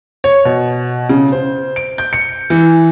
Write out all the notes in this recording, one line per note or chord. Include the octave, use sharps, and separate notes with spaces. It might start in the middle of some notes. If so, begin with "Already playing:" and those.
C#5
B2
C#3
C5
D7
G6
C#7
E3